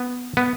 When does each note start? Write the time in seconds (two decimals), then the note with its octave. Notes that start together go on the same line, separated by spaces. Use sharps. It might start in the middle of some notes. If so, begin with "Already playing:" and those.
Already playing: B3
0.37 B3